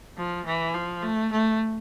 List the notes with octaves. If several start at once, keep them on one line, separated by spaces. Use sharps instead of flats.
F3
E3
F3
A3
A3